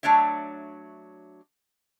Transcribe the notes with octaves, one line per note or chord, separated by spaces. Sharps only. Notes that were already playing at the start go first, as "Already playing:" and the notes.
F#3 A3 D4 C#5 E5